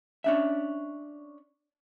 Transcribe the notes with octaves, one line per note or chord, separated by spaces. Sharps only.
C#4 D4 E5